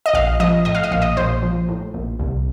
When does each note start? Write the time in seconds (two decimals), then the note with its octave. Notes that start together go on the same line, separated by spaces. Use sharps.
0.06 D#5
0.14 A#1 F5
0.40 F3 D#5
0.65 A2 D#5
0.75 F5
0.84 D#5
0.91 A#1 F5
1.02 D#5
1.17 A#1 C5
1.42 F3
1.69 A2
1.94 A#1
2.20 C2